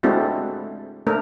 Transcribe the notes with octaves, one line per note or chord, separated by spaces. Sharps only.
G#3 A3 C4 D4 E4 F#4
A3 D4 A#4